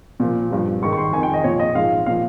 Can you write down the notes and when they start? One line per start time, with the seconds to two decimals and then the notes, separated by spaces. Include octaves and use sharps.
0.20 A#2 F3
0.51 G2 F3
0.82 G#2 D#3 C#6
0.93 C#6
0.98 C6
1.13 D#3 G#5
1.16 F2
1.23 G5
1.34 D#5
1.44 A#2 F3 C#5
1.59 D#5
1.75 G#2 F3 F5
2.06 A#2 F3 F5